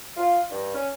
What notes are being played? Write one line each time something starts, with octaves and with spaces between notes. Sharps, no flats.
F4
G2
C#4